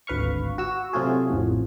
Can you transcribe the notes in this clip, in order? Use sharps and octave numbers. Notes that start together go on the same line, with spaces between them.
G#1 D2 B4 F5 C#6
F#4 E6
C3 F#3 A3 F4 F#4 G#4
A1 F2